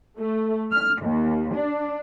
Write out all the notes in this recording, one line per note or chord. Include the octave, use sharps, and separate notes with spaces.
A3
F6
D#2
D4